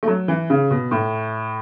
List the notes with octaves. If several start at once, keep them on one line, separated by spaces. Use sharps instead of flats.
A3
F#3
E3
C#3
B2
A2